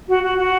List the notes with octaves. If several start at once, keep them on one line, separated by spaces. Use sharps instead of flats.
F#4
F#4
F#4